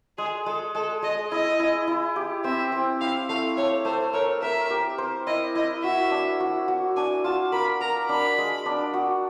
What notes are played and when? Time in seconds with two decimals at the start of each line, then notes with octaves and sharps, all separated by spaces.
0.18 G#3 G#4
0.46 G#3 A4
0.75 G#3 A4
1.02 G#3 D#5
1.31 E4 D#5
1.59 E4
1.87 E4
2.16 G4
2.44 C4 E5
2.72 C4
3.01 E4 F5
3.29 A3 F5
3.57 A3 C#5
3.85 A3 C5
4.13 A#4 C#5
4.42 A#4 E5
4.70 G4
4.98 C5
5.27 E4 D#5
5.55 E4 D#5
5.83 F#4 E5
6.11 D4
6.40 F#4
6.68 F#4
6.96 D4 G#5
7.24 F4 A5
7.52 A#4 B5
7.80 A#4 A#5
8.09 D4 B5
8.38 G#3
8.66 D4
8.94 F#4